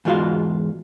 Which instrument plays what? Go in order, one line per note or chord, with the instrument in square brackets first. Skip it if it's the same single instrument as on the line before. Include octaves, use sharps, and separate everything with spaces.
[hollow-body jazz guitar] E2 G#2 G#3 F4 F#4 F5